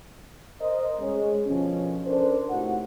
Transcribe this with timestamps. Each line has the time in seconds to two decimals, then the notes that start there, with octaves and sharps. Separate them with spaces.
0.61 A#4 C5 D#5
1.00 G#3 C#4
1.46 B2 D3 F3 C#4
2.07 D4 A4 A#4 C5
2.50 A2 C3 A3 D#4 F#4 F#5